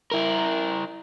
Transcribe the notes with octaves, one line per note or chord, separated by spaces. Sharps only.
E4 A#4